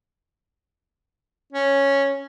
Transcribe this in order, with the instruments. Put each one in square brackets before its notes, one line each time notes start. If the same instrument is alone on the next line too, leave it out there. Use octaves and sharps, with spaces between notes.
[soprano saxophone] C#4